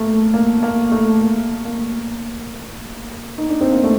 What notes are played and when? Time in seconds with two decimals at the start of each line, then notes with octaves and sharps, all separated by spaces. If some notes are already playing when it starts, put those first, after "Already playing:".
Already playing: A3 A#3
0.34 A#3
0.63 A#3
0.92 A3
1.21 A#3
1.65 A#3
3.38 D#4
3.49 D4
3.61 C4
3.72 A#3
3.84 A3